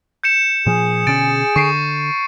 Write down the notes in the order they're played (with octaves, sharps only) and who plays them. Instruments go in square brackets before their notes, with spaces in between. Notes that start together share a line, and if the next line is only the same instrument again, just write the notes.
[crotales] G6 C#7 E7
[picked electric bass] A#2 F3 [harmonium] G#4
[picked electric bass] B2 D3 C#4 [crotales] A6 D7
[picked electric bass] D3 [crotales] C#6 C7 D7